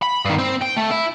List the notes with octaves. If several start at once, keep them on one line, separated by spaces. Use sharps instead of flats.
B5
G2 D#3
C4
G5
A3
E4